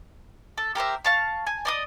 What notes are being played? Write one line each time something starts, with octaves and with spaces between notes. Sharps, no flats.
A4
G4 A#4 C5 E5
F5 A5 C#6
G#5
D5 D#5 D#6